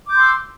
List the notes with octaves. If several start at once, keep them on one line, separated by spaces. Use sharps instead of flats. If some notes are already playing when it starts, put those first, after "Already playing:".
C6 D6 E6 G6